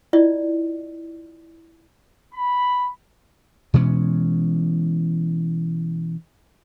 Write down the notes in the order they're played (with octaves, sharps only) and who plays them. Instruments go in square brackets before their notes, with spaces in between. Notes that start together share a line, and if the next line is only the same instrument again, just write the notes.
[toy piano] E4 F4 D5 D#5
[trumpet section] B5
[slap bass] B2 E3 G#3 C#4